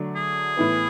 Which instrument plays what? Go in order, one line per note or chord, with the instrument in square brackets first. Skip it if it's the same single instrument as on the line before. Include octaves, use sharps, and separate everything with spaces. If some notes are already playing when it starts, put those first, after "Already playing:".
Already playing: [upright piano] D3 F#3 A3 D4
[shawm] G#4
[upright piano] A2 E3 B3